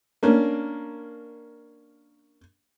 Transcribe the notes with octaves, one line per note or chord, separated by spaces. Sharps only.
A#3 C#4 D4